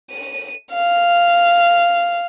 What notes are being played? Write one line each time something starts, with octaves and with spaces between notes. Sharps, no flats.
D#7
F5